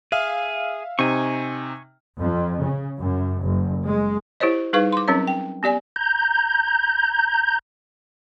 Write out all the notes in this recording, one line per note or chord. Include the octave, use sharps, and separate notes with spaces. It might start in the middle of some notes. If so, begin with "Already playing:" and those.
G#4 E5 F5 F6
C3 C4 D#4 G#5 C#6
F2
C#3
F#2
F#1
G#3
E4 G4 C5 C#5 D#5
G3 D#4 G#4 B4 F5 C#6
C6 D6
F#3 C4 C#4 A#4 C#5
G5
B3 G4 D5 G#5
A#5 G6